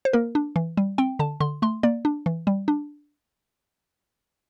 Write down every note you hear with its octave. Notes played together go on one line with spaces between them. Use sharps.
C5
A#3 A#4
D4
E3
G3
C4 G5
D3 A5
D3 C6
A3 C6
A#3 D5
D4
E3
G3
D4